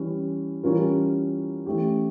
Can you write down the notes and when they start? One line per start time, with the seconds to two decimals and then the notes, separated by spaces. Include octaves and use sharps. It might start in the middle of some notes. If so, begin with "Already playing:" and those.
Already playing: E3 G3 C#4
0.63 E3 G3 C#4 F4 A#4
1.66 E3 A3 C#4 G4